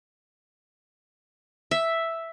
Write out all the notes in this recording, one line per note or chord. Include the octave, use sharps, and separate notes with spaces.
E5